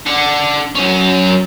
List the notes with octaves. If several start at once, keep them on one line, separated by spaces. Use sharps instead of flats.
D4 F#5
F#3 C#4